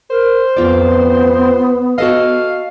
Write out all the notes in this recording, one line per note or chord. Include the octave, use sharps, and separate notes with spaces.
A#4 C5
F2 B3 F4 D5
F#4 A4 D#5 F5